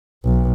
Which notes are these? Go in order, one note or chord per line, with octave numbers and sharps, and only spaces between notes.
B1